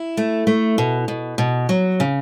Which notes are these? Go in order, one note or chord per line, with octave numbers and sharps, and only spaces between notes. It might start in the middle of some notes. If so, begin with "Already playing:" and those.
Already playing: E4
A3
A3
B2
B2
B2
F#3
C#3